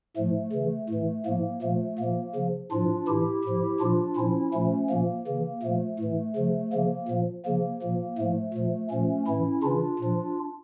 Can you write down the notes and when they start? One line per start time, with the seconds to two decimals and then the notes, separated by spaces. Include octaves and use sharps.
0.17 A2 F3 A3
0.52 C#3 E3
0.89 A2 E3
1.26 A2 F3 A#3
1.62 A#2 F3 A3
1.99 A#2 F3 A#3
2.35 C#3 F3
2.71 A2 F3 D4 F4
3.07 A2 E3 E4 G4
3.45 A2 F3
3.80 A#2 F3 D4 F4
4.17 A#2 F3 C#4 E4
4.53 A#2 F3 A3 C#4
4.90 A#2 F3 A#3
5.27 C#3 E3
5.63 A#2 F3 A3
5.99 A2 E3
6.36 C#3 F3
6.73 C#3 F3 A#3
7.08 A#2 F3
7.45 C#3 F3 A#3
7.82 A#2 F3
8.18 A2 F3 A3
8.54 A#2 F3
8.90 A#2 F3 A3 C#4
9.27 A2 E3 C#4 E4
9.63 C#3 E3 D4 F4
9.99 A#2 F3